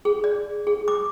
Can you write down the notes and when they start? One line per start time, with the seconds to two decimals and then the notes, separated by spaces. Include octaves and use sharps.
0.05 G#4
0.24 D5
0.67 G#4
0.88 D6